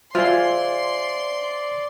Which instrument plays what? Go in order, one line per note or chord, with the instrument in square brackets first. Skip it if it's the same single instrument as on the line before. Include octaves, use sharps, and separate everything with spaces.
[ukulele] F4 G#4 [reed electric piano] C5 E5 G#5 [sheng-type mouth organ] D5 [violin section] C6